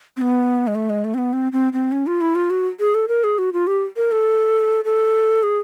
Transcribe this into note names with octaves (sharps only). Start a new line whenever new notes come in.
C4
B3
G#3
A3
G#3
A3
C4
B3
C4
C4
C4
C#4
F4
E4
F4
F#4
G#4
A4
A#4
G#4
F#4
F4
G4
A#4
A4
A4
G#4